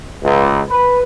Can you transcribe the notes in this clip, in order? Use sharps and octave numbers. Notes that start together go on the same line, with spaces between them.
C#2
B4